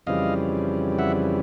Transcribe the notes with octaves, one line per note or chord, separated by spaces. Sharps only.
F2 C#3 E3 G3 D#5 F5
E5 F#5